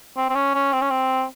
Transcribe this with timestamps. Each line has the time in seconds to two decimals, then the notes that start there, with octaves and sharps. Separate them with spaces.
0.17 C4
0.30 C4
0.35 C#4
0.55 C#4
0.73 C4
0.82 C#4
0.90 C4